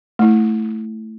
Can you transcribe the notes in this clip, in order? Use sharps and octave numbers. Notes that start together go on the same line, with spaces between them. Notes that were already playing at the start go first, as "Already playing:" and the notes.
A3 E4